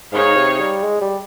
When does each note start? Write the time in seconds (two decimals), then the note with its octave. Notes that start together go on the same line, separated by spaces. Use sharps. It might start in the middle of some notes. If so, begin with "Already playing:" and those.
0.12 G#2 D#4 G#4 C#5 F5
0.36 C3
0.60 G3
0.83 G#3
1.01 G3